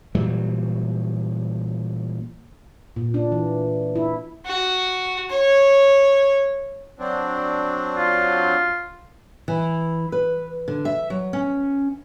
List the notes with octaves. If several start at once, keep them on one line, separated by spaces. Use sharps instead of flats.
A#2 E3 F#3 G3
A#2
D4
E3
E4
F#4
C#5
F#3 C4 D4
F4
E3
B4
D3
E5
F#3
C#4